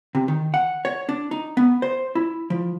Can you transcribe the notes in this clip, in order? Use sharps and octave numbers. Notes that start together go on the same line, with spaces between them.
C3
D#3
F#5
C#5
D4
D#4
B3
C5
E4
F3